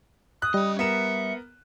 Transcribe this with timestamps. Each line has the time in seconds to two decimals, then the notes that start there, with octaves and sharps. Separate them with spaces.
0.42 D#6 F#6
0.54 G3 C#4 D#5
0.79 B3 A#4 E5 C#7 E7